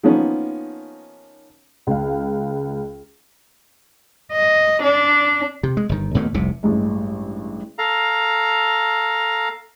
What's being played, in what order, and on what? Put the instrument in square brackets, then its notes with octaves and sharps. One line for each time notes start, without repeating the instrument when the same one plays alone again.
[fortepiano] D#3 F3 A#3 B3 C#4
[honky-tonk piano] C#2 F5
[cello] D#5
D4
[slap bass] C3
G#3
G1 D#3
D#2 B2 A3 A#3
F1 C2 C3
[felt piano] A1 G2 G#3
[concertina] A4 F5 A#5